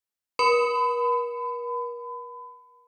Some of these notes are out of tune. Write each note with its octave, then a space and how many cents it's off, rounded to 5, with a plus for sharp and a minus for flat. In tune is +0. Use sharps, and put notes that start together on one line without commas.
A#4 +45 B5 +35